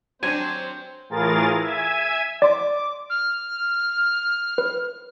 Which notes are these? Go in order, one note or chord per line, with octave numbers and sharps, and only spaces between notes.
F#3 C4 D4 F#4 C5 G#5
A2 E3 F4 G#4 A#4 A6
E5 G#5 G#6
D5 C6 D6
F6
B4